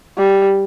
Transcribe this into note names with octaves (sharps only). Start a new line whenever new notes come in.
G3